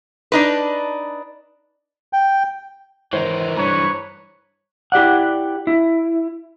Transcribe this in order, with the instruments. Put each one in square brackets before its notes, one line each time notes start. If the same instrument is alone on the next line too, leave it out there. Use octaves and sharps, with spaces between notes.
[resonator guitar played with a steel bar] D4 D#4 B4
[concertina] G5
[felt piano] G#1 C#5 [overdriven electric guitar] E3 A#4 [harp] C5
[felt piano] G2 A#5 [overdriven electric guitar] D3 E3 [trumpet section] B4 C#5
[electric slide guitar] E4 G4 D5 F#5
E4